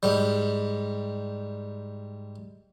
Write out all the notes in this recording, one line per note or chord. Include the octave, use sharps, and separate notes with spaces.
G#2 G3